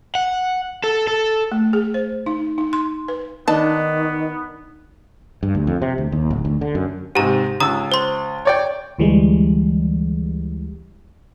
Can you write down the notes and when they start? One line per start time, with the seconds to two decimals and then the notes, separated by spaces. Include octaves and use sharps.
0.15 F#5
0.84 A4
1.07 A4
1.52 A3
1.73 G#4
1.94 C5
2.26 D#4
2.58 D#4
2.73 C6
3.08 B4
3.48 D#3 B3 D4 D#4 A5
5.43 G2
5.55 D2
5.67 F2
5.82 C3
5.98 D2
6.12 D#2
6.30 D1
6.45 D2
6.61 D3
6.75 F#2
7.15 G#2 C3 G4 A#5
7.60 C#2 A#5 D#6 E6
7.92 C5 C6
8.45 C#5 D5 G5
8.99 D2 E3 G3 G#3